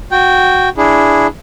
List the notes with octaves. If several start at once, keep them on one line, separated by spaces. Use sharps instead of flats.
F#4 G5
D4 E4 G#4